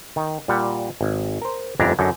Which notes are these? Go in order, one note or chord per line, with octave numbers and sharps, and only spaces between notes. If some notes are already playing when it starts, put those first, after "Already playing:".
D#3
A#2 G3 F#5
G#1
A#4 C5
G1 F2 G#2 D4 E4 A#5
F#2 D3 D#4